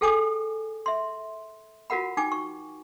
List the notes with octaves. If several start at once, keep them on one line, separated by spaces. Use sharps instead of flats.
G#4 A4 G5 G#5 D6 D#6
E5 C6
F4 F#4 A#4 F#5 B5
D#4 G5 G#5 D6
C#6